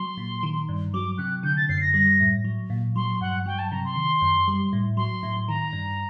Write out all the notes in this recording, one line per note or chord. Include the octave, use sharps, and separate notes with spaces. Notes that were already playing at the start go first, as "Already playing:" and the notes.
Already playing: F#3 C6
A#2
D#3
G2
F#3 D6
C3 F#6
D3 G6
A6
F#2 C7
A#6
G3 A#6
A2
F#3
A#2
F#3 C6
G2 F#5
F#3 G5
A5
C3 A#5
C6
D#3
F#2
G3
A2
F#3 C6
A2
D#3 A#5
G2